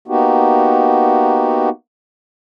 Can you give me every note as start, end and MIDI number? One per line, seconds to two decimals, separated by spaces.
0.08 1.69 58
0.08 1.69 59
0.08 1.69 63
0.08 1.69 66
0.08 1.69 67